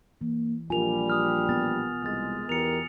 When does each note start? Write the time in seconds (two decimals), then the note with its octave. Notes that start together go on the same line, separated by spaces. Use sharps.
0.21 E3 A#3
0.70 A#1 G3 F4 A#4 G#5 F7
1.10 D#6 F6
1.49 B3 A6
2.03 C2 G#3 F6 A6
2.49 E2 B2 G4 A#4 C#7 F7